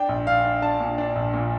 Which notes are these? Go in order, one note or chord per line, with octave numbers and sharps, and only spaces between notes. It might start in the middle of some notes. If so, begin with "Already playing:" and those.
Already playing: D4 G5
A#1
D4 F5
D4
D4 A5
A#2
D4
A#1
A#2